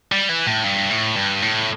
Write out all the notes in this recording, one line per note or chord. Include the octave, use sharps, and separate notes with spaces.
G3
E3
A2
G2
A2
G2
A2